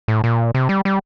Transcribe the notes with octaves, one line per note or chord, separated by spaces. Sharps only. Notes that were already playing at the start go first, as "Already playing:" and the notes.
A2
A#2
C3
G3
G3